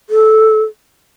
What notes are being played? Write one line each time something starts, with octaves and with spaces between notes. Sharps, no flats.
A4